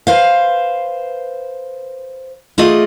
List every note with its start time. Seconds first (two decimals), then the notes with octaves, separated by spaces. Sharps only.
0.07 B4 C5 F5
2.58 A3 F4 G#4 D5 D#5